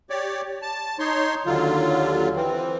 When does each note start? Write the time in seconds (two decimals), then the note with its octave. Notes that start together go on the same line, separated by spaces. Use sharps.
0.10 G4 C#5 D5
0.62 A5
0.99 D#4 C#5 C6
1.46 D#2 D3 F#3 F4
2.36 E3 C4